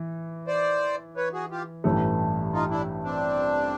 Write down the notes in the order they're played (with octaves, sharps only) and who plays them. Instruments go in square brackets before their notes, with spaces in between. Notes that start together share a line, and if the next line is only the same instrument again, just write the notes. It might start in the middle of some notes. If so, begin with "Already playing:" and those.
Already playing: [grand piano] E3
[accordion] C5 D5
B4 C#5
F#4 G#4
F4 G4
[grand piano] A1 G2 E3 A3
[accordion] D#4 F4
D4 E4
C4 D4